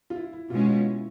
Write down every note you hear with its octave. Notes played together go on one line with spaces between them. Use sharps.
F4
E4
E4
B2 G#3 C#4 F4
F4
E4